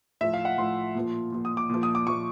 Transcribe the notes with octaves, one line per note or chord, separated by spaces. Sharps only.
A2 F3 E5
F5
F#5
A2 F3 C6
A#2 F3
A#2 F3
D#6
D6
A#2 F3
D#6
D6
A#2 F3 C#6